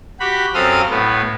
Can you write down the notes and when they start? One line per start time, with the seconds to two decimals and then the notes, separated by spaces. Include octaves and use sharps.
0.20 F#4 G4 B5
0.54 F#2 C4 A4 F5 D#6 F6
0.90 A2 B3